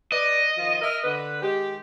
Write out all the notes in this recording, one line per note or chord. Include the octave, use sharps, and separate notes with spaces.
B4 D5 D#5
D#3 F3 F4
A#4 E5
D3 B4
D#3 G#3 G4